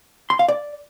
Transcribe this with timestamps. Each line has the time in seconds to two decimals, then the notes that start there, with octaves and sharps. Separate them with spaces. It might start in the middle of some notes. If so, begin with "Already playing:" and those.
0.30 C6
0.39 F5
0.48 D5